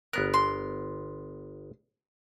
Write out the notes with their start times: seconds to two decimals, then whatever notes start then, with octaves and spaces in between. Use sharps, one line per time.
0.13 G1 B3 A#4 F#6
0.34 C6